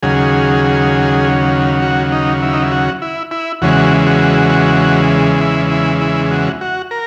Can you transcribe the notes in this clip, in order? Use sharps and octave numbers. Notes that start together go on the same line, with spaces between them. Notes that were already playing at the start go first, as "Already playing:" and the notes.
D#2 C#3 F#3 G#4
F#4
D#4
E4
D#4
E4
F#4
E4
E4
E2 C#3 E3 G#3 F#4
F#4
E4
E4
E4
F#4
F#4
A#4